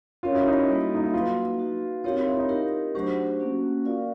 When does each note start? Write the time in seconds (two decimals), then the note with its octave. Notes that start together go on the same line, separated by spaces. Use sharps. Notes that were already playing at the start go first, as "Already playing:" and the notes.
0.23 C#4 F4 F#4 A#4 C#5
0.35 E4
0.47 D#4
0.59 E4
0.68 G3 A#3 D#4 F#4 A4
0.95 D#4
1.04 E4
1.13 F#3 A#3 D#4 F4 F#4 B4
1.59 D#4 F#4 B4
2.04 C4 D#4 F4 G4 A#4 C#5
2.15 F4
2.27 E4
2.38 D#4
2.49 D#4 F4 G4 A#4
2.95 F#3 A3 D4 F#4 G4 C5
3.40 A#3 C#4 F#4
3.85 F4 A#4 D5 F5